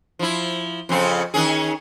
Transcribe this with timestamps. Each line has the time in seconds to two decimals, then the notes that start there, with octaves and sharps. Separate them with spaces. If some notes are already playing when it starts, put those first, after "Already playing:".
0.19 F3 E4
0.89 F2 C#3 C4
1.34 D#3 C#4 G#4